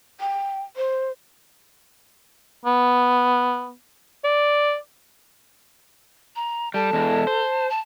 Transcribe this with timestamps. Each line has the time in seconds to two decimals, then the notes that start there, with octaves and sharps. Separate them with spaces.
0.21 G5
0.77 C5
2.65 B3
4.24 D5
6.36 A#5
6.74 G3 A4 A5
6.93 E2 G#3
7.27 C5
7.70 A5